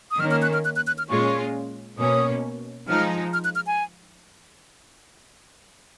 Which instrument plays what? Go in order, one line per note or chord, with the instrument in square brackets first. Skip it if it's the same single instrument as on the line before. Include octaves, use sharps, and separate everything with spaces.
[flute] D#6
[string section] D#3 A#3 C#4 [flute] F6
[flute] F6
F#6
F6
F#6
F#6
F#6
F6
[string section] A#2 G#3 C#4 F4 [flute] C#6
[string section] B2 A#3 C#4 [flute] D#6
[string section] F3 G#3 D#4 [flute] F6
[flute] F6
F#6
F6
G#5